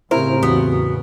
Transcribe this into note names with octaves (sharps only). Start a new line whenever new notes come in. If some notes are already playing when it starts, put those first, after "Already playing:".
A2 C#3 C4 E4 G4 A#4 C5
E2 B3 F#4